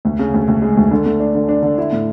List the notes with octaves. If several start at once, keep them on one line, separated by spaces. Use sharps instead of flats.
D2
C#3
D2
D2
G#3
D2
D3
A3
D4
D3
D4
D3
E4
A2